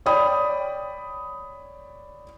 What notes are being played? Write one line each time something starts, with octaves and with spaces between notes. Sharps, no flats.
C#5 D5 G5 B5 D#6